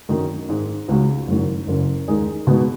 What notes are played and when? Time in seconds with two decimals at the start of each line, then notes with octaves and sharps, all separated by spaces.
0.09 F#2 D#3 F#3 D#4
0.49 G#2 D#3 G#3 D#4
0.88 C#2 C#3 G#3 D#4 F#4
1.27 F#1 F#2 D#3 F#3
1.67 F#1 F#2 C#3
2.08 D#2 D#3 G#3 D#4 G#4
2.47 B2 G#3 B3 D#4 F#4